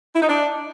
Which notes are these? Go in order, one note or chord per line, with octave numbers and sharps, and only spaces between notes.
E4
D#4
D4